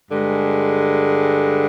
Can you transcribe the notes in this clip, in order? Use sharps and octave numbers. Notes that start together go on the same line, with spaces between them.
G2 D3 G#3